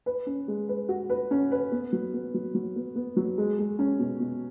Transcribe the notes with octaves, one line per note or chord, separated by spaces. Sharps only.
B4
C#4
G#3
B4
F#4
B4
C#4
B4
B3
F#3
B3
F#3
F#3
B3
B3
F#3
G#3
G#3
C#4
B2
B2